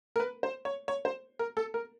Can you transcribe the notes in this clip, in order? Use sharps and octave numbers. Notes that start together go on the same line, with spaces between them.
A#4
B4
C5
C#5
C#5
C5
A#4
A4
A#4